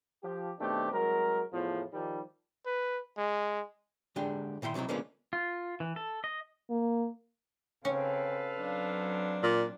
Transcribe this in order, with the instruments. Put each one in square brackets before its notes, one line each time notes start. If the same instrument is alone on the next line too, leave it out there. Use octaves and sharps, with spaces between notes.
[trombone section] F3 G4
B2 D#3 A3 C4 D4 G4
C2 F#3 G#3 A#4
E2 A2 F3
D#3 F3 G3
[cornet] B4
G#3
[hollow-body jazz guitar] D3 G#3 D4 G4
A#2 D#3 E4 E5 C6
B1 C3 F#3 D#4 E4
D3 F3 G#3 A#3 B3 C#4
[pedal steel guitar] F4
E3
A4
D#5
[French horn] A#3
[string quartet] C#3 C4 [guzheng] C#4 [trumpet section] A4 B4 F5
[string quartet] F#3 C4 D4
[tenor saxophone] A#2